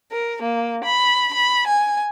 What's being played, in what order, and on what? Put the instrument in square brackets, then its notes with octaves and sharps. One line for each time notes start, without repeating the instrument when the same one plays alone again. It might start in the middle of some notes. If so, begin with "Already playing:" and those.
[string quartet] A#4
A#3
B5
B5
G#5